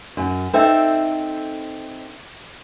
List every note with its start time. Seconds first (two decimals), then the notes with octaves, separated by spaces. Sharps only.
0.17 F#2
0.53 C4 D#4 A4 E5